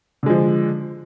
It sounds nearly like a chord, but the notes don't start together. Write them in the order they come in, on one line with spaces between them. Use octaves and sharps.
D3 G#3 F3